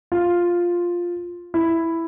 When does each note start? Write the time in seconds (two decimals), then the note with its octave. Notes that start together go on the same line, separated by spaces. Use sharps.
0.12 F4
1.54 E4